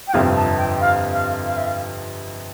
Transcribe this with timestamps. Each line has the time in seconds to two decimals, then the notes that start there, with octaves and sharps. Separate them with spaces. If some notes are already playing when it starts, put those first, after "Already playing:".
0.08 G5
0.13 G1 F2 C3 F3 F5
0.36 A5
0.58 G5
0.81 F5
1.13 F5
1.47 F5
1.58 E5
1.67 F5